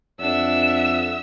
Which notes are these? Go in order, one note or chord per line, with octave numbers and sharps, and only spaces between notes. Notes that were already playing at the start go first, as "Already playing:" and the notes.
F2 D4 E5 F#5 E6